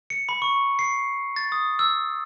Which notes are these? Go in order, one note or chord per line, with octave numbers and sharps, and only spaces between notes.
C#7
B5
C#6
C7
A6
D#6
E6